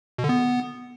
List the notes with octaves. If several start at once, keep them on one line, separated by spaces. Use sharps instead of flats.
B2
D3
B3